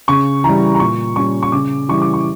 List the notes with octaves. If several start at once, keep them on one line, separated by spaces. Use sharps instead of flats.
C#3 C#6
E3 A#5
G3
A#5
A#2 C#6
G3 C#4 C#6
C#6
C#3 D6
E3 G3 C#6
D6
C#6